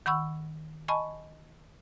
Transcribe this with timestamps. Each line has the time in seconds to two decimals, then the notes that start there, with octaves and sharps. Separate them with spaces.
0.06 D#3 F#5 B5 C#6 E6
0.88 D#5 G#5 A5 B5 C#6